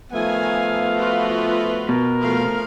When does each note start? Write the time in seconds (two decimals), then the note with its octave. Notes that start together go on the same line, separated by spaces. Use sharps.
0.12 D#3 F3 A3 B3 F5 G#5
0.97 F4 F#4 B4
1.89 B2 A#4
2.21 F3 A3 F5